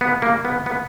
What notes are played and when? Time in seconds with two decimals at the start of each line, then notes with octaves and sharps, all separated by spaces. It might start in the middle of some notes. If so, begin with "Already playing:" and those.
0.01 B3
0.22 A#3
0.45 B3
0.66 B3